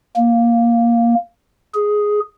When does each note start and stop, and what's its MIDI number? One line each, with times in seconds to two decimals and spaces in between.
0.17 1.15 58
1.74 2.20 68